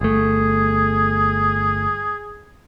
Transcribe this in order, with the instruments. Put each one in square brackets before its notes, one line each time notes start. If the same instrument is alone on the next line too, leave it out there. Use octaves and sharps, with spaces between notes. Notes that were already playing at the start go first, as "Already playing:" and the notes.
[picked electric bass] G1 A3 [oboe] G#4